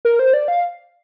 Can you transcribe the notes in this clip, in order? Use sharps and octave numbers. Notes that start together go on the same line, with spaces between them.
A#4
C5
D5
F5